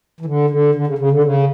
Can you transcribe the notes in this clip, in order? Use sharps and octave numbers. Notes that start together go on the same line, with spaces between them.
E3
D3
D3
D3
C#3
C#3
D3
C#3